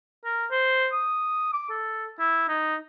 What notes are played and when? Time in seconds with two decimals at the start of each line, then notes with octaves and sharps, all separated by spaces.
0.25 A#4
0.51 C5
0.92 D#6
1.53 D6
1.70 A4
2.19 E4
2.48 D#4